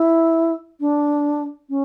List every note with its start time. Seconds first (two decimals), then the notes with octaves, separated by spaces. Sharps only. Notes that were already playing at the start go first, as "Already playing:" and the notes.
Already playing: E4
0.80 D4
1.69 C#4